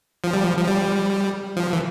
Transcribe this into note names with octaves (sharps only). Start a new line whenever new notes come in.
F3
G3
F3
F3
G3
F3
E3